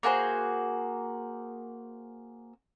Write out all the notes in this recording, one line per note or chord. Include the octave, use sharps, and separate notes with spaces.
A#3 F#4 G#4 C5